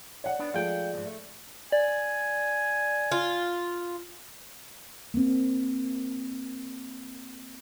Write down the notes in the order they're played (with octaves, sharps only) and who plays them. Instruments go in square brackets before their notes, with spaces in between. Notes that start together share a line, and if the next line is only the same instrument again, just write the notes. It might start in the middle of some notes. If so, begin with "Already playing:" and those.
[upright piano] C#5 F#5 [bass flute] D5
[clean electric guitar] B3 D4
[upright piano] F3 G#3 A3 [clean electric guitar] F5 G5
[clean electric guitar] D#2 G#2
A3
[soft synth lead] D5 [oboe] G#5
[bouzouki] F4
[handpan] A#3 C4